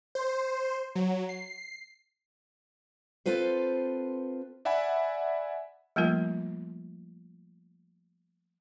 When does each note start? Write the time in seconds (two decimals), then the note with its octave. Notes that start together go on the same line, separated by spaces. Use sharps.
0.15 C5
0.95 F#3
1.29 C7
3.26 C4 F4 A4 B4 C5
4.65 D5 E5 F#5 G#5 B5
5.96 F3 G3 A3 A#3 F4 A#4